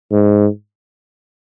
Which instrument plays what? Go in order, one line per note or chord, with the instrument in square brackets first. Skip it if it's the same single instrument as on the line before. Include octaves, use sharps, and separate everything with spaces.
[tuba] G#2